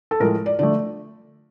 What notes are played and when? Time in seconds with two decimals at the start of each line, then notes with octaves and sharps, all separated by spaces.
0.11 A4
0.20 A2 F3 G#3 A#4
0.46 D5
0.59 D3 F3 A3 D5